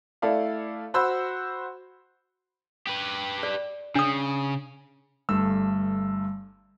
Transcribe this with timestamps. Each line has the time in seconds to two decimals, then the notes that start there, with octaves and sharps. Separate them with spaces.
0.22 A3 E4 A4 D5 F5
0.94 F#4 C5 F#5 B5 E6
2.87 G4 B4
3.43 D5
3.95 C#3 D4 D#6
5.29 G1 G2 A3 E6